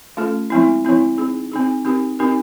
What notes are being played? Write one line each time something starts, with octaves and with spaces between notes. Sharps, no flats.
A3 C#4 F4 A4
F3 G#3 C4 E4
F3 G#3 C4 E4
C4 D#4 G#4
C4 D#4 G#4
C4 D#4 G4 A#4
C4 D#4 G4 A#4